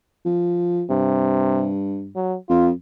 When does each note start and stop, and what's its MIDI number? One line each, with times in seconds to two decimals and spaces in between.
0.25 0.83 53
0.90 2.11 43
0.90 1.69 48
2.16 2.36 54
2.49 2.71 41
2.49 2.69 65